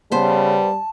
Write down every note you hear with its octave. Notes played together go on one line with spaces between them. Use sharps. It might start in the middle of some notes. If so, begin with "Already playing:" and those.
C#3 G3 B3 C5 A5